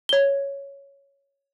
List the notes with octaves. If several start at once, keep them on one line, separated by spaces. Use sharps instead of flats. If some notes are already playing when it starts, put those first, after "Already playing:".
C#5 G7